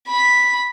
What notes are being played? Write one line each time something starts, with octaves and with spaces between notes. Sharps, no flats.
B5